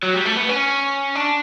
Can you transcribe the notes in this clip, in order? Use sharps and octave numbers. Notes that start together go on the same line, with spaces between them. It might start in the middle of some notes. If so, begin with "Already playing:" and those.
F#3
G3
A3
B3
C#4
D4